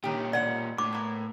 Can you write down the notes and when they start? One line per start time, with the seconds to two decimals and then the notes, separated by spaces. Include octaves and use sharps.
0.04 A#2 D#3 C#4 G4
0.33 B2 D5 F#5
0.78 A2 D6
0.93 A#3 B3